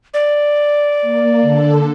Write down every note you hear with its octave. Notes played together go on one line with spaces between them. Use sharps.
D5
A#3
D3 A4